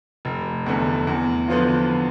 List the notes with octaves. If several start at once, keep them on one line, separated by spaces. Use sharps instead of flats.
F1
E2 D3 A3
E2
D3 F3 B3 F4